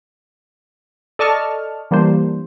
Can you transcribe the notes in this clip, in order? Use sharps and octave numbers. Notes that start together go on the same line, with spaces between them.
A4 D5 D#5 A5 C#6 F6
E3 G3 A#3 D4 C5